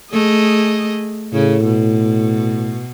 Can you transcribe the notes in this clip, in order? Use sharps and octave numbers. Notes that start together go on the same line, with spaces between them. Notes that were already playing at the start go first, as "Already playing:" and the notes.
A3 G#4 D#5
A2 C#3
B2